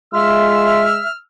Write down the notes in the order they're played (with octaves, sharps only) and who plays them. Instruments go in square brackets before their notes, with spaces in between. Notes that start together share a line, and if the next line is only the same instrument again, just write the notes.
[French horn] G#3 [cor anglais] F4 [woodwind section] E5 [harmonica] E6 F6